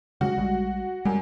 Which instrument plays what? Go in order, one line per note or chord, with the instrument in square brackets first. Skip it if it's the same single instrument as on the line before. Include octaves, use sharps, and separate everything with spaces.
[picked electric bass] C#3 F#3 G#3 [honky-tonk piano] F#4
[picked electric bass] A#1 G3 G#3
[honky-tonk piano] F#2 [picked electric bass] G3 G#3